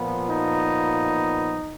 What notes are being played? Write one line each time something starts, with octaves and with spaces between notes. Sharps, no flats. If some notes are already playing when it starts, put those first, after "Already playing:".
Already playing: A#2 F3 B3
D#4